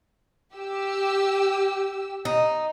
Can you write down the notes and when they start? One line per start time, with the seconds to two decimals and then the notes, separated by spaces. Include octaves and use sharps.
0.55 G4 E6
2.25 D#4